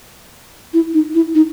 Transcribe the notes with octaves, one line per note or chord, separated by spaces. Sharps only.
E4
D#4
E4
D#4